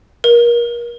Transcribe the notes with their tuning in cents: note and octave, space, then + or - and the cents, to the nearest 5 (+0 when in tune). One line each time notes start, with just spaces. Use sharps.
A#4 +30